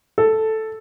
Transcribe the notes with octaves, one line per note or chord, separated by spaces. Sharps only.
A4